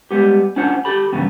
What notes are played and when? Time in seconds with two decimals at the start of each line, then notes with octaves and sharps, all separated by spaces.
0.11 G3 G#3 B3 G4
0.56 C#4 D4 F4 C5 F#5
0.85 G4 A4 B5
1.12 E2 G2 C#3 B3